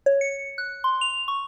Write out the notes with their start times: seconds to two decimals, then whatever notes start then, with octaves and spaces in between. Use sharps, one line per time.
0.06 C#5
0.21 C#7
0.58 F#6
0.84 C6
1.01 F7
1.28 C#6